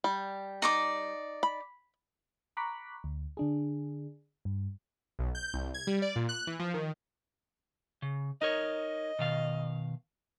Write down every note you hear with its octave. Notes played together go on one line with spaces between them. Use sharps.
G3
D#4 D5 D6
B5
A#5 B5 C#6 D6 F#6 B6
D2
D3 D4 G#4
G2
B1
G6
C2
G#6
G3
D5
A#2
F#6
E3
F3
D#3
C#3
D#4 A#4 C#5 D#5
B2 D#3 F5